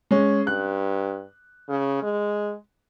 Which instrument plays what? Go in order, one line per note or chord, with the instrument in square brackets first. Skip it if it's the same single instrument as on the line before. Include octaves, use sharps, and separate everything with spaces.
[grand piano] G#3 C#4
[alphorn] G2 [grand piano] F#6
[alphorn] C#3
G#3